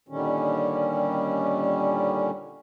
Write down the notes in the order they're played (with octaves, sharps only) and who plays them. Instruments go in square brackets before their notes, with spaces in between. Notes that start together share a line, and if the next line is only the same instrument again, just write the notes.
[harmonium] A#2 D3 D#3 G3 C#4